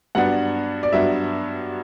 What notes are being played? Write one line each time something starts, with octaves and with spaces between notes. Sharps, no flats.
G2 F#3 B3 D4 F#5
D5
G2 F#3 B3 D4 E5